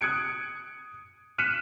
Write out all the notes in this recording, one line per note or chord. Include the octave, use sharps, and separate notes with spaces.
D#6 F#6 G#6 C#7 D7
F6 F#6 B6 C#7 D#7 E7